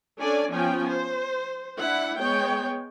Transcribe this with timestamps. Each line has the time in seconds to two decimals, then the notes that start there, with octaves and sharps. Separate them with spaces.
0.19 C#4 D4 A4 D5 G#5
0.50 F3 B3 C#4 G5 G#5
0.88 C5
1.79 D4 E4 F#5
2.19 G#3 B3 C#5 G5